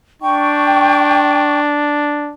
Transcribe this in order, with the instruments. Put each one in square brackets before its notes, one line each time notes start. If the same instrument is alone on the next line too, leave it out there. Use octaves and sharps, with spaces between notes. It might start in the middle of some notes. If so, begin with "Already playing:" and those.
[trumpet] D4 [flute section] G5 C#6